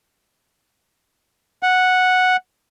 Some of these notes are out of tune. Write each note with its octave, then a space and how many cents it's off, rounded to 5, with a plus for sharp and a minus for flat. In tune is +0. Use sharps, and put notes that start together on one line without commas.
F#5 -5